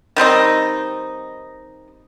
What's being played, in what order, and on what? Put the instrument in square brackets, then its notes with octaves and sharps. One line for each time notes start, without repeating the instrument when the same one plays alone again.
[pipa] D#3 G3 C4 D#4